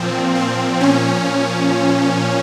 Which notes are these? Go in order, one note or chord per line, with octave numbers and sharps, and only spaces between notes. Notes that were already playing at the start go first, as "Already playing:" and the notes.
Already playing: A#2 F3 C4
C4
A#2 F3 C#4